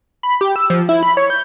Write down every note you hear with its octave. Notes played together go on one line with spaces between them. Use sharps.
B5
G4
E6
F3
E4
B5
C#5
G6